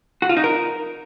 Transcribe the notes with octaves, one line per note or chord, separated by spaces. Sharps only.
F#4
F4
D#4
A#4